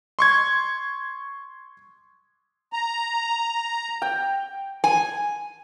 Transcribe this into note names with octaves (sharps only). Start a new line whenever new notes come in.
C6 C#6 G#6
A#5
G5
G#5